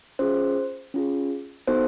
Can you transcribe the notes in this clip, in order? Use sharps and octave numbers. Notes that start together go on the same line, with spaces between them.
C#4 F4 G#4 C5
C#4 F4 G#4
B3 D#4 F#4 A4 C5